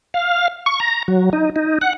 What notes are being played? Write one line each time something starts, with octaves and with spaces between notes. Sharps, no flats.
F5
C#6
A#5
F#3
D#4
D#4
F#5